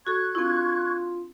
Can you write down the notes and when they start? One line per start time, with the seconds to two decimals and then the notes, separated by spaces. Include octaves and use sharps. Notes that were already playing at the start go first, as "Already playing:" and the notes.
0.07 F#4 A4 C#6 F#6 G#6
0.35 C4 D4 E4 F4